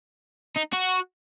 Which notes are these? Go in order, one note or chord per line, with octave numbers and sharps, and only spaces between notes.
D#4
F#4